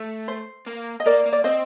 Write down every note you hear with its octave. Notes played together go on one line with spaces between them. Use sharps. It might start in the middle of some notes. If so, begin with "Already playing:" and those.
Already playing: A3
C5
A#3
D#5
A#3 A#4 D5
A#3
D5
C4 C5 D#5